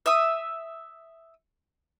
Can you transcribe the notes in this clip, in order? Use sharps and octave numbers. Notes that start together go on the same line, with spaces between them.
E5 D#6